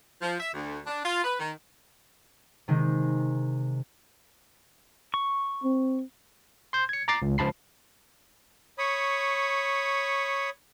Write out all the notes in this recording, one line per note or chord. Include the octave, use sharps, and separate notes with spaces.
F3
E5
D2
D4
F4
B4
D#3
C3 D#3 G#3
C#6
C4
C6 G6
G#6 C#7
A#5 D6 A6 C7
C#2
C#2 F3 F4 A5 B5 C7
C#5 B5 C#6 D#6